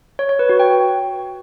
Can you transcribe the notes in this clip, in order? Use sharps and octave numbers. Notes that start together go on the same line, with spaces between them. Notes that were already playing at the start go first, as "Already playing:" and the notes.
C#5
C#5
B4
F#4
G5